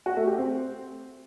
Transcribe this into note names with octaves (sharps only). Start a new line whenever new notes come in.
F#4
A3
G4
C4